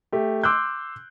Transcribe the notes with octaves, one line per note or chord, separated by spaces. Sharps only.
A3 G4
C6 D6 E6 F#6 G6